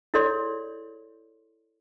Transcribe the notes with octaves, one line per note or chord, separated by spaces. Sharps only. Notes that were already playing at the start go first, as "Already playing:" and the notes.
E4 G#4 A4 C#5 D5 C6